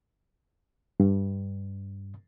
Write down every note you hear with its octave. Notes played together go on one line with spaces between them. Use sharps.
G2